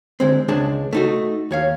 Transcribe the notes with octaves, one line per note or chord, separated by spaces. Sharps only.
D3 G#3 C4
C#2 G#3 D4 G#4 A5
A3 D#4 F#4
D#2 C#5 F5